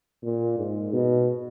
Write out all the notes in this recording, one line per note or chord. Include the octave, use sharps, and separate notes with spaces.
A#2
G#2
B2